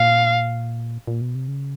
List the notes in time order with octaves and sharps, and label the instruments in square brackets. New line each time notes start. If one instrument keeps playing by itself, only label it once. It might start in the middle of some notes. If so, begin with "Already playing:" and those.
Already playing: [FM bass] A#2 [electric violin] F5
[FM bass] A#2
B2
C3
C#3